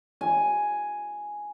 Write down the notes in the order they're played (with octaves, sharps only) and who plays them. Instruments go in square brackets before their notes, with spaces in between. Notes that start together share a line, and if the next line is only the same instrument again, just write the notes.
[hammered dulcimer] G#5